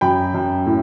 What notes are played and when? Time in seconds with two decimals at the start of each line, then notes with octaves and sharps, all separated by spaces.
0.01 F#2 G5 B5
0.34 F#2
0.66 A2